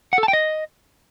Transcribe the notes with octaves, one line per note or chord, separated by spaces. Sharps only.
F#5
A4
A5
G5
D#5